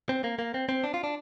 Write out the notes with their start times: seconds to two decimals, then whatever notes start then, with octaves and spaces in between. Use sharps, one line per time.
0.09 C4
0.24 A#3
0.39 A#3
0.54 C4
0.69 C4
0.84 D4
0.94 F4
1.04 D4